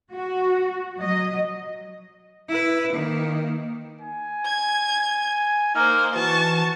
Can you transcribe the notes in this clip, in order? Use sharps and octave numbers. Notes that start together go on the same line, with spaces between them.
F#4
F#3 D#5
E4 B4
D#3 A#3
G#5
G#6
A#3 D#4 C5 F6
E3 F#4 A5 C#6